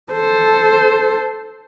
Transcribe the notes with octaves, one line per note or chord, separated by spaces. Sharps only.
A4 C5